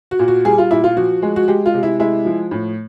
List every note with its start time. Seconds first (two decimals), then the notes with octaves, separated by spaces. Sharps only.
0.11 F#4
0.19 A#2
0.28 F#4
0.45 G3 G#4
0.58 F4
0.71 A#2 E4
0.84 F4
0.97 F3 F#4
1.22 G#3
1.36 F#4
1.48 G#3 G4
1.66 F4
1.74 C3
1.83 E4
1.99 G#3 E4
2.25 F3
2.51 A2